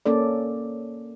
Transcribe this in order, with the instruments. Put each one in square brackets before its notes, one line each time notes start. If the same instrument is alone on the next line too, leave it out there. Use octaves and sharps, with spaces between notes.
[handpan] A#3 C#4 A4 D5